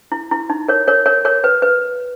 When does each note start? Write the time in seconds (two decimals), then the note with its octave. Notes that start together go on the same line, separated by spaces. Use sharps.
0.12 E4
0.32 E4
0.50 D#4
0.68 A#4 C#5
0.88 A#4 C#5
1.06 A#4 C#5
1.25 A#4 C#5
1.44 B4
1.62 B4